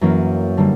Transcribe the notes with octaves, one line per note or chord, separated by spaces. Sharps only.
F#2 E3 A#3 C#4
D3 G3 A#3